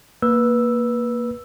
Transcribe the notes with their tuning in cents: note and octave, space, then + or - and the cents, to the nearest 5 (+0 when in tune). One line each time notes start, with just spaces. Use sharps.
A#3 +0 B4 -20 E6 +0